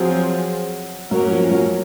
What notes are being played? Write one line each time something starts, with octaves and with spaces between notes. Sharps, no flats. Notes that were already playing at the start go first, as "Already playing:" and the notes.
Already playing: F3 F#3 C4 F4 G#4
F#3 A#3 C#4 F#4 A#4
F3
F#3